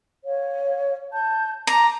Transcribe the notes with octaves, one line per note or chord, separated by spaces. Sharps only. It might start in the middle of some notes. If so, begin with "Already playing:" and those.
C#5 F5
A5 G6
A5 A#5 D6